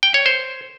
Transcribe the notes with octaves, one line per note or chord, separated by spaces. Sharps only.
G5
C#5
C5